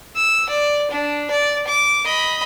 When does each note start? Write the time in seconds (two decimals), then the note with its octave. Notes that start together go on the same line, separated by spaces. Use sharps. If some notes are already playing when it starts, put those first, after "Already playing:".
0.16 E6
0.49 D5
0.91 D4
1.31 D5
1.67 D6
2.05 D#5 B5